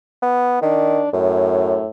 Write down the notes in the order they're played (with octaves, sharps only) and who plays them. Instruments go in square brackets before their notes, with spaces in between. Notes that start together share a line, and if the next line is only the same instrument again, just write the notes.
[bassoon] B3
[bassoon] D#3 [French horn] D4
[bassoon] F#2 [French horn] A2